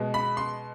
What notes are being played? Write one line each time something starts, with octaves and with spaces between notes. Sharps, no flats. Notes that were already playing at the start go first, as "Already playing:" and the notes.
Already playing: B2 G#3
B5
C6